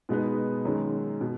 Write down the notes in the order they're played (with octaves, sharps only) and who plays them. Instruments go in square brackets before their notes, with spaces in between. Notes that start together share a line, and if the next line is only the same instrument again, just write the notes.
[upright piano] B2 G#3 B3 D#4
F#2 D#3 G#3
B2